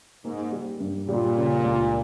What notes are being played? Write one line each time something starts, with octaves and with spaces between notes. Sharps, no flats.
G#2 A#3
G3
G2
A#2 G3
C#3
C#2